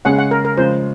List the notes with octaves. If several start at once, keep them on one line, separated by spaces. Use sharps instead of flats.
C#3 G#3 C#4 G#4 F#5
F#5
A#4
A#4
C#3 F3 G#3 C5